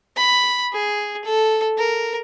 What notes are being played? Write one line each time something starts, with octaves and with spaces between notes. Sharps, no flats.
B5
G#4
A4
A#4